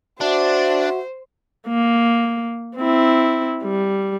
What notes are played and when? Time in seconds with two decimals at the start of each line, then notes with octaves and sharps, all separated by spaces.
0.21 D4 F#4 C5 E5
1.68 A#3
2.77 C4 E4
3.64 G3